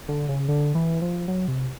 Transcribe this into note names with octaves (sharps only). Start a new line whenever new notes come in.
D3
C#3
D3
E3
F3
F#3
C3